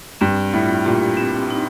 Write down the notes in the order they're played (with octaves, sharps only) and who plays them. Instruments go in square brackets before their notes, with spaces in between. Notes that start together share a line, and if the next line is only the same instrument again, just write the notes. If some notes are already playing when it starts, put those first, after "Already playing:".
[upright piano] G2 [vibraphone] C4
[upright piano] A2 [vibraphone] F4
[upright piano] A#2 [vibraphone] G4
[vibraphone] C4
D#4